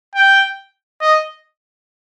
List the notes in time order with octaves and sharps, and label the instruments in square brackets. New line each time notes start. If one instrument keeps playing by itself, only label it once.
[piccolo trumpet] G5
D#5